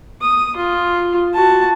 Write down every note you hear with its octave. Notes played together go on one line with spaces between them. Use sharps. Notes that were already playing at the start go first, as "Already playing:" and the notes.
D#6
F4
F#4 A5